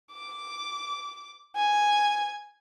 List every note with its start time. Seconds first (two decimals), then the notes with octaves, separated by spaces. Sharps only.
0.12 D6
1.56 G#5